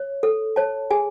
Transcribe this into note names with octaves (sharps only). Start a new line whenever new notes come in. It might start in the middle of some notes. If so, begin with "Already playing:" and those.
Already playing: C#5
A4
C#5 A5
G#4 G#5